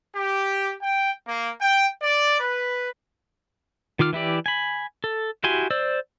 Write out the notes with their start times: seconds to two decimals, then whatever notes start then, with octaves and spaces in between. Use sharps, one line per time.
0.15 G4
0.81 G5
1.26 A#3
1.59 G5
2.01 D5
2.39 B4
3.99 D#3 F4 D6 F6
4.13 E3 E4 G4 D5
4.46 G#5 B5
5.04 A4
5.44 E4 F#4 G4 G#5 C6
5.71 C5 D5 E6